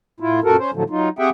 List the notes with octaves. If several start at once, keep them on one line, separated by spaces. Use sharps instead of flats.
A2 E4 F4
F#2 A#2 F#4 A4 A#4
C#4 C5
A2 D3 F3 F#3 A3
F#3 D#4 F4
C4 G4 G#4 E5 F#5 G5